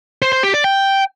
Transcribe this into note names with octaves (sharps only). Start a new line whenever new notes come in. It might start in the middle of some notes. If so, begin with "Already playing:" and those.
C5
C5
G4
D5
G5